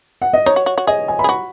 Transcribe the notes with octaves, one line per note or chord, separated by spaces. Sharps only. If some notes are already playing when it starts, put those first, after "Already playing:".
F#5
D#5
D#4 C#5
F#4
F#4
F#4
G#4 D#5
G#5
B5
G#4
F#4